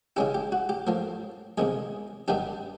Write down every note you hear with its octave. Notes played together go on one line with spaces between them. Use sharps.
C#3 E3 G#3 C#4 E4 G4
G4
F#4
G4
A2 F3 A#3
E2 C3 D#3 G#3 G#4
G2 D#3 G3 B3 D4 G4